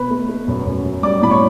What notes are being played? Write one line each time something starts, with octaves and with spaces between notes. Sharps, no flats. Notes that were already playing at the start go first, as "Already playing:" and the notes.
Already playing: B2 B4 B5
A3
A3
F#2
F#2
F#2
G3 D5 D6
A2 B5
C#5 C#6